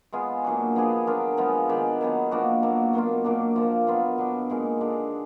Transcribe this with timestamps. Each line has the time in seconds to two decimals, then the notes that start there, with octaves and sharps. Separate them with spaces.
0.12 G#3 B3 F4 G#4
0.44 A#2 F#3 D4 F#4
0.75 F3 B3 D4 G#4
1.07 F#3 D4 F4 A#4
1.37 F3 G#3 B3 F4
1.69 D#3 G#3 D4
2.01 D#3 F#3 B3
2.31 F3 A#3 D4 F#4
2.62 B2 F#3 A#3
2.93 B2 F#3 A#3 F4
3.24 A#2 F#3 A#3 D4
3.56 F3 A#3 F4
3.87 B2 F#3 B3 F4
4.18 B2 F#3 D4
4.50 A#2 G#3 D#4 A#4
4.80 D3 G#3 D4